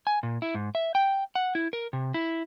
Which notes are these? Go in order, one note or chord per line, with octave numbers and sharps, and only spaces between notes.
G#5
A#2
E4
G#2
E5
G5
F#5
E4
A#4
C3
E4